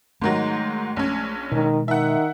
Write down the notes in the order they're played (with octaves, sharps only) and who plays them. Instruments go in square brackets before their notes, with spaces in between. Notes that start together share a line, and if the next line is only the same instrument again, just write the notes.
[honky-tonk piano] G#2 D#3 F#3 [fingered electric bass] G#3 A3
[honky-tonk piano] A#1 C#4
[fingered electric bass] B2 G#3 [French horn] D#3
[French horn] D#3 [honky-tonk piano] E5 F#5